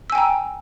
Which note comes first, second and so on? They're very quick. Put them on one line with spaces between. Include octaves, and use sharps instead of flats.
E6 G#5 G5 A#5